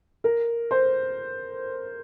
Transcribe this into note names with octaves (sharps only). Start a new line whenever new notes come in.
A#4
C5